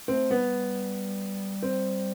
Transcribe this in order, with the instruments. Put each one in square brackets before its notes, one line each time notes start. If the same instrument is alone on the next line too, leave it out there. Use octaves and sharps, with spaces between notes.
[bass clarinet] A3 [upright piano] C4
[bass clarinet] G3 [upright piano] B3
[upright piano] C4